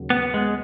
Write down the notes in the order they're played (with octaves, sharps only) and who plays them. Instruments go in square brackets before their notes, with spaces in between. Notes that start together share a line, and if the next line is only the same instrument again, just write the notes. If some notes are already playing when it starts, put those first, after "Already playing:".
Already playing: [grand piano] D#2 C#3 F#3
[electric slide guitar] B3
G#3